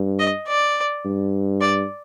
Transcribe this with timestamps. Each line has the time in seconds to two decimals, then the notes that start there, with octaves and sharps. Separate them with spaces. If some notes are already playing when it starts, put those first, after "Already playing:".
Already playing: G2
0.19 D#5
0.48 D5
1.05 G2
1.61 D5